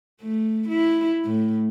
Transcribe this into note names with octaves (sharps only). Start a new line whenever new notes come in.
A3
E4
A2